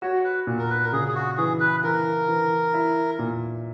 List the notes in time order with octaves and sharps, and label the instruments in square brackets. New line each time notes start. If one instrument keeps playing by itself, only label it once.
[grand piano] F#4 [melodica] C#5
[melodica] B4
[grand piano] A#2
[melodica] A#4
B4
A#4
[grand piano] C#3 [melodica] G#4
[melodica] G#4
F#4
[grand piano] E3 [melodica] G#4
[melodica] B4
[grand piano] E3 [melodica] A#4
[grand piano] E3
E4
A#2